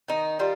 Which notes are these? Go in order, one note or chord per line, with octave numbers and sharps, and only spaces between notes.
D#3 D#4
G3 F4